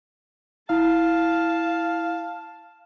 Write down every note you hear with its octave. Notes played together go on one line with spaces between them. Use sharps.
E4 F5 A5